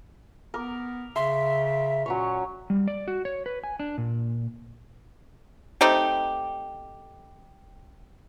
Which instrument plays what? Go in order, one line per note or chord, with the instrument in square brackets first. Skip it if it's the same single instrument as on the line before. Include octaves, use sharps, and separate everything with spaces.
[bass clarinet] B3 [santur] A#4 D6
[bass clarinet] C#3 [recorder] E5 [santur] C6
[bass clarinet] A#2 [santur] F#3 C#4 C#5
[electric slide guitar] G3
D5
F#4
C#5
B4
G#5
D4
A#2
[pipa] A3 C4 D#4 G4